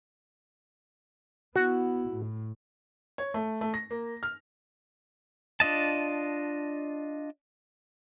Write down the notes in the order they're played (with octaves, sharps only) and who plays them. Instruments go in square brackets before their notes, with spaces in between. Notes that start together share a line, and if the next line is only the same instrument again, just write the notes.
[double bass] B3 E4 [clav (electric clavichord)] F#4
[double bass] A2
[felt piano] C#5
A3
A3
A#6
A#3
F6
[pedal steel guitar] D4 F4 D#5 A5